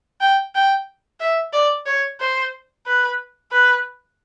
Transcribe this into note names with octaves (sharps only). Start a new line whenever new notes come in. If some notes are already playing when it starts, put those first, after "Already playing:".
G5
G5
E5
D5
C#5
C5
B4
B4